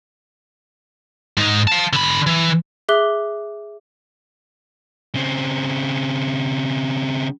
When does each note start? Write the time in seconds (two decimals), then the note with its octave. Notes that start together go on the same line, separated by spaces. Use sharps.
1.37 G#2 D#4
1.67 F5 A5
1.93 D3 B5
2.27 E3
2.89 G#4 E5 D6 F#6 G7
5.15 C#3 C4